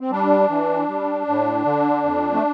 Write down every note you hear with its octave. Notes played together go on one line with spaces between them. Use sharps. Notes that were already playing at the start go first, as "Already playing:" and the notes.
C4
G3 D4
E3
G3
A2
D3
F2
A3